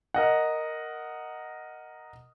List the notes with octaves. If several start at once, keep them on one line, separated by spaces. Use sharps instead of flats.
A#4 D#5 F#5